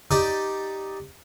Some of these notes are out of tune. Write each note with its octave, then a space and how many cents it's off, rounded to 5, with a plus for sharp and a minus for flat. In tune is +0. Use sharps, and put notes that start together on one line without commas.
D#4 +0 G4 +0 D5 +0